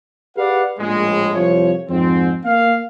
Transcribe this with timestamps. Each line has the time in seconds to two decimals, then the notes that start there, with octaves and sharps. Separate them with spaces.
0.37 G4 G#4 B4 D5 F5 F#5
0.79 A#1 A2 G#3
1.34 C2 F2 F3 C#5
1.90 F2 G#2 C4
2.45 A#3 F5